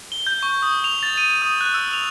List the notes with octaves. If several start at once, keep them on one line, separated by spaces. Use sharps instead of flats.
G7
G6
C#6
D#6
F7
A6
D#7
D#6
F#6
E6
F7